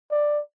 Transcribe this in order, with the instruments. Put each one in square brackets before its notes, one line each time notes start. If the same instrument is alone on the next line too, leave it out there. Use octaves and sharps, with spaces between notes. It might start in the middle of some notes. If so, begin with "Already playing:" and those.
[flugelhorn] D5